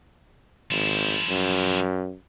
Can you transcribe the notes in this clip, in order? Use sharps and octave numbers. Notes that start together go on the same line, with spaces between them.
G#1 F3 E4
F#2